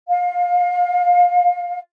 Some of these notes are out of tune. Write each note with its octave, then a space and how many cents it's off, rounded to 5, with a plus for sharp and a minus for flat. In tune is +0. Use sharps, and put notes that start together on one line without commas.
F5 +25